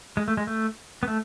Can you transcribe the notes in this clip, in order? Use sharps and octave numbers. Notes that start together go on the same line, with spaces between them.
G#3
A3
G#3
A3
B3
A3